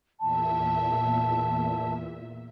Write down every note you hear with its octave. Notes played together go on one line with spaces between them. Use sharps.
E2 A#2 E5 A5